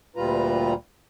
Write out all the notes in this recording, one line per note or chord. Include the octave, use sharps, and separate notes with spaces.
D2 A#2 G3 F4 B4 A#5